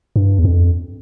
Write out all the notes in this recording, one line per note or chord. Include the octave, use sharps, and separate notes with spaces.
G2
E2
F2